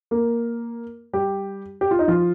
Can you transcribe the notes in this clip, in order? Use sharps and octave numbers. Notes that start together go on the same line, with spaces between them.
A#3 A#4
G3 G4
G4
F4
D#4
F3 F4